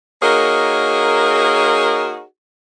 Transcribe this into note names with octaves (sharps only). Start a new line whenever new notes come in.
A#3 D#4 F#4 G#4 A#4 C#5